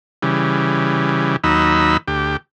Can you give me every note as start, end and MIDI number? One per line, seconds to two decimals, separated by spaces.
0.22 1.36 49
0.22 1.36 52
0.22 1.36 55
1.44 1.97 39
1.44 1.97 54
1.44 1.97 63
1.44 1.97 83
1.44 1.97 88
2.08 2.37 38
2.08 2.37 67